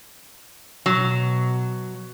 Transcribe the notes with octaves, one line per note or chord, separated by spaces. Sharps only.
B2 F#3